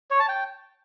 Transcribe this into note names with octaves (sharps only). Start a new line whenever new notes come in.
C#5
A5
G5